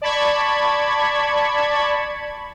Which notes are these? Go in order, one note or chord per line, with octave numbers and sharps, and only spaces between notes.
D5 A5 B5 C#6 G#6